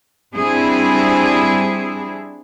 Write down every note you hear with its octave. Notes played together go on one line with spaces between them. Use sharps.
G3 C4 D4 E4 G#4